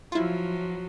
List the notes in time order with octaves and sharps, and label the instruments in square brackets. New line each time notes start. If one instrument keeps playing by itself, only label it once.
[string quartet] F3 F#3 [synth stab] E4 F4